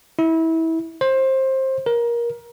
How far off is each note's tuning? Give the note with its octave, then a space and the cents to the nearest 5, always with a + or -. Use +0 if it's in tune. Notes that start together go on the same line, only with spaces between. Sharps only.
E4 -25
C5 +20
A#4 +20